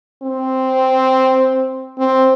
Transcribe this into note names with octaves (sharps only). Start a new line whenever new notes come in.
C4
C4